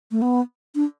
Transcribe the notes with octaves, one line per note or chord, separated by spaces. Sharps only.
A3
B3
D4